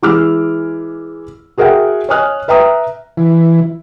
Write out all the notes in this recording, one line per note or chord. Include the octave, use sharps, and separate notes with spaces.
E3 G#3 D6 E6 F6
F#4 G#4 A#4 E5 F#5 G5
C#5 D#5 G#5 D#6 F6 F#6
B4 E5 G5 A#5 D#6
E3